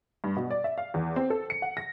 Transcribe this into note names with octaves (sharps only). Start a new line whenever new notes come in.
G2
B2
D5
E5
F5
E2
C4
A4
C#7
F#5
A#6